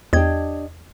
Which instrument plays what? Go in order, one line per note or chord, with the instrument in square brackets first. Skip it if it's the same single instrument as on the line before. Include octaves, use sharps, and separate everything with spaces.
[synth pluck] E2 G#6 [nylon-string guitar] D4 G4 D#5